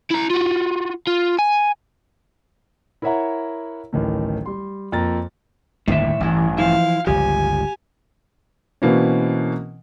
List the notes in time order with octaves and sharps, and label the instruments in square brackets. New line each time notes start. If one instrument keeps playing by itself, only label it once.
[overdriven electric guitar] E4 A#5
F4 F#4
F4
G#5
[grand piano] E4 A#4 C#5 E5 F#5 A#5
D1 A1 D#3 A3
G3 C6
F2 A#3 A#4 A#5 A6
[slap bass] G1 D#2 D3 [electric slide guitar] A2 D#3 E5
[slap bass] A1 G2 [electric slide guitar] E3 E4
[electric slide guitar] E3 F3 E4 [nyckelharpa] F5
[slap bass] G1 C#2 F3 [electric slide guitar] G4 [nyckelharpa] G#5
[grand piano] B2 E3 A#3 C4 C#4